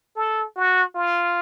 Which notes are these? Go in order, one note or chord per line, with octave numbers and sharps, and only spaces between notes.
A4
F#4
F4